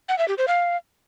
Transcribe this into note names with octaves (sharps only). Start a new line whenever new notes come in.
F#5
E5
G4
C5
F5